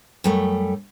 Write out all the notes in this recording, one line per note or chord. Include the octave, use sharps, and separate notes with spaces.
F#2 G3 A3